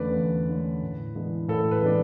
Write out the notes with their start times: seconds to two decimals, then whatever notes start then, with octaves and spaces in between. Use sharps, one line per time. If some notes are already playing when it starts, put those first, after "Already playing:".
Already playing: E2 D3 A3 C#4 B4 D5
0.16 E2
0.49 D3 A3 C#4
0.83 A2
1.15 E3 G#3 B3 D4
1.48 A2 A4
1.71 B4
1.82 E3 G#3 B3 D4